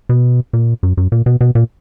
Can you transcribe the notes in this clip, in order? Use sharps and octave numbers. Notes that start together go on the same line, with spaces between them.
B2
A#2
F#2
F#2
A#2
B2
B2
A#2